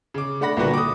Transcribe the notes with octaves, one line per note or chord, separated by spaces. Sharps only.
C#3 D6
A3 D4 F#5 B5 A#6
C2 A#2 D3 F#4 B4
D6 D#6